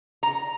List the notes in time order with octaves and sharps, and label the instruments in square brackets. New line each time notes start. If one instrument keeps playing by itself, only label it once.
[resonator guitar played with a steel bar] A#5